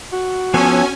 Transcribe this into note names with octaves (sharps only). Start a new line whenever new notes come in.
F#4
F3 B3 C#4 A4 G#5